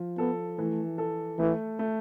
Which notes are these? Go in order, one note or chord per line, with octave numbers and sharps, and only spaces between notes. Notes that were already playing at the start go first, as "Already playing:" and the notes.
Already playing: F3
B3 A4
E3 A3
A4
E3 A3
A3